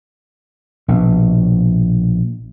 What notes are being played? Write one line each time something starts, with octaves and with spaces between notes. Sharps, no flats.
A#1 B2